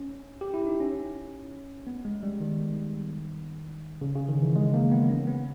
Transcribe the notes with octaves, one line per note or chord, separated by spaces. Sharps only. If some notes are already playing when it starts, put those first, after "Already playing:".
Already playing: C#4
G4
E4
D#4
C#4
B3
G#3
G3
D#3
C#3
C#3
D#3
E3
G#3
A#3
B3
C#4
B3